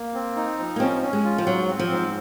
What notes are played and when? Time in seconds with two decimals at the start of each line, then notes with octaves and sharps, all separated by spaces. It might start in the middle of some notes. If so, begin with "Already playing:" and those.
Already playing: A#3
0.14 C4
0.36 D#4
0.59 F3
0.76 A#3
0.80 C4 C#4
1.02 C#4
1.13 G#3
1.25 F4
1.38 F3
1.47 G#2 F#3
1.68 C4
1.79 F3
1.90 G#2